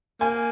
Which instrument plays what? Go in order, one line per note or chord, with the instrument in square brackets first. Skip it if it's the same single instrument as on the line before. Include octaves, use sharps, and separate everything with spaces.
[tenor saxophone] A#3 [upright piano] G#5